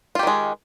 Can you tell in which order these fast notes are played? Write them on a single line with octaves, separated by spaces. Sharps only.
F4 G4 D#3 G#3